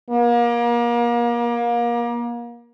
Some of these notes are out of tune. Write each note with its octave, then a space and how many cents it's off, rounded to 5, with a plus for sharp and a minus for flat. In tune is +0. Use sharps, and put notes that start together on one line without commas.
A#3 +30